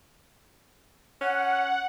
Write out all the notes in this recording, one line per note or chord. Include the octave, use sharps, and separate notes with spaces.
C#4 F#5